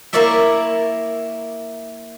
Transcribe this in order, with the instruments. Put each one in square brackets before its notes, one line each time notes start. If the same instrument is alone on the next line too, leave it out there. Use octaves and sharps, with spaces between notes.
[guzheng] A#3 E4 A#4 C#5 D5 E5